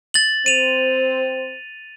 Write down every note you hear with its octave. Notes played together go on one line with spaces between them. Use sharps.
A6 F#7
C4 C5 D#7 F7